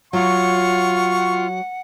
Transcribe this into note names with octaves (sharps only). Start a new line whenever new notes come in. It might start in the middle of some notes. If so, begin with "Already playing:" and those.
F#3 F4 F#5 C#6